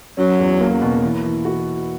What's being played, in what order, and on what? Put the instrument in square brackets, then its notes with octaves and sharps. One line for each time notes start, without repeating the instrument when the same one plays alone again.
[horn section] F#3 [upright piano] C#4
[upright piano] E2
A#3
B2
E3
E3
F#4